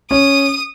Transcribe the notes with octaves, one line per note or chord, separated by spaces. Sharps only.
C#4 D#6